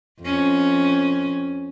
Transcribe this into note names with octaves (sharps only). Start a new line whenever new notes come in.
F2 C#4